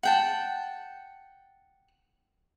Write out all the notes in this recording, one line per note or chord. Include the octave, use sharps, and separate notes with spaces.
F#5 G5 A5